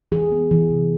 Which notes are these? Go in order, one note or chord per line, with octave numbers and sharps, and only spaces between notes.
E3 G#4
B3
E3
C3